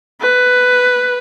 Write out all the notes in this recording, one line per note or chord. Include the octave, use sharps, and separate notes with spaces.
B4